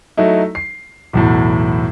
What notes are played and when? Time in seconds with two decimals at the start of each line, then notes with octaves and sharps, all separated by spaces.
0.17 F#3 A3 D#4 E4
0.55 C7
1.13 B1 E2 A2